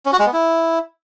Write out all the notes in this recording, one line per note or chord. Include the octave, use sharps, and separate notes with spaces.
C#4
F#4
G#3
B3
E4